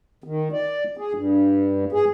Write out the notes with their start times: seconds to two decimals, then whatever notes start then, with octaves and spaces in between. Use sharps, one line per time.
0.24 D#3
0.52 D5
0.97 G#4
1.14 G2
1.92 G#4